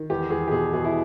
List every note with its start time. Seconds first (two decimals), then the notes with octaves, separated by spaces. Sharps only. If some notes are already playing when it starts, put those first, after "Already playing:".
Already playing: D#3
0.10 E2 G4
0.30 E2 G#4
0.48 G4
0.51 B2 G#4
0.73 B2 G#4
0.85 E4